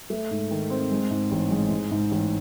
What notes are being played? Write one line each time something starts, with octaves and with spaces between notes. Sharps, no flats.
A3
G#2
D#3
C4
G#3
G#2
A1
G#3
G#2
G#2
A1